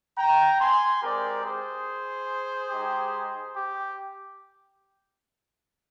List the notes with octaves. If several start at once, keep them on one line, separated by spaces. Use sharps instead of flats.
G5 A#5
G#5 C6
G#3 C4 G4 A#4 D5
G#4 C5
G#3 D#4 G4
G4